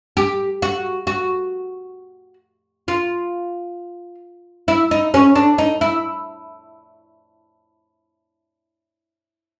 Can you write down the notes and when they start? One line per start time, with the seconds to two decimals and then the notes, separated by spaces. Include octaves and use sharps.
0.17 G4
0.62 F#4
1.07 F#4
2.88 F4
4.68 E4
4.91 D#4
5.14 C#4
5.35 D4
5.58 D#4
5.81 E4